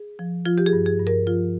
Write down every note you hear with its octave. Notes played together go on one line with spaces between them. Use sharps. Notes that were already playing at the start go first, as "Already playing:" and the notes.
Already playing: G#4
F3
F3 F4
G4
G#4
G2
G#4
G2
A#4
F3 F4